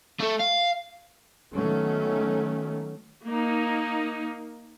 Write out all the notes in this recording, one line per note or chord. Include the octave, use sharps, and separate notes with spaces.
A3 A4
F5
D#3 F#3 A3 B3 C#4
A#3 D#4